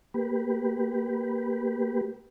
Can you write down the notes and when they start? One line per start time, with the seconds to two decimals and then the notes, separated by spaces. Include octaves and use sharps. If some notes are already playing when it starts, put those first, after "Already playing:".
0.14 A#3 G4 B4